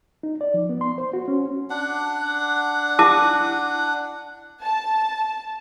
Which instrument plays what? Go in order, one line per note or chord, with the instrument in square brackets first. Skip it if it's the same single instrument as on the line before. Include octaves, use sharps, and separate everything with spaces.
[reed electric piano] D#4
D5
F3
B3
C6
C5
F#4
C#4
[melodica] D4 F#5
[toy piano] E4 A5 D6
[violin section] A5